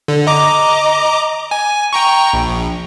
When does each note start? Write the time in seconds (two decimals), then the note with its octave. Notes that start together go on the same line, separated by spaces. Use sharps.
0.08 D3
0.27 D#5 A#5 D6
1.51 G#5
1.93 G5 A#5 C#6
2.33 A#1